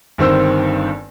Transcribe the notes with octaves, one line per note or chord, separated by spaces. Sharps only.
G1 G2 D#3 C4 C5 E6